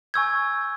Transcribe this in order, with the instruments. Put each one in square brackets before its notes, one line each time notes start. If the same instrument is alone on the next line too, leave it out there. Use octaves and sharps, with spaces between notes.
[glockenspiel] G#5 C#6 E6 G6 G#6